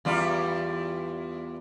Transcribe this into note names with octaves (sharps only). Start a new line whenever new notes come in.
E2 G3 F4